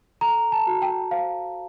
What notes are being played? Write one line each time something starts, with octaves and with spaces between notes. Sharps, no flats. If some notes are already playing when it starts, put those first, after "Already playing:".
A4 A#5
A5
F#4
G5
C5 F5